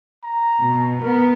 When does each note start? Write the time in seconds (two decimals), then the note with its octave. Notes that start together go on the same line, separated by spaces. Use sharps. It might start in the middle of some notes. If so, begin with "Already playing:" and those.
0.24 A#5
0.59 B2
1.02 B3 A#4